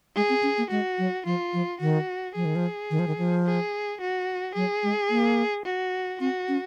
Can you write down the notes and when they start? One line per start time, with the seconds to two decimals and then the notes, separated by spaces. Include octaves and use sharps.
0.16 G#3 G#4
0.29 C4
0.43 C#4
0.58 A#3
0.71 G#3 F#4
0.99 F#3
1.26 F3 F4
1.53 F3
1.81 D#3 F#4
2.35 F3 G#4
2.45 D#3
2.55 F3
2.91 D#3
2.99 F3
3.07 D#3
3.18 F3
3.46 G#4
4.01 F#4
4.55 F#3 G#4
4.83 G#3
5.10 A#3
5.65 F#4
6.20 C4 F#4
6.48 C#4